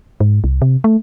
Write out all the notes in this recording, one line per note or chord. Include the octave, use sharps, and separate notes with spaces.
G#2
C2
C3
A3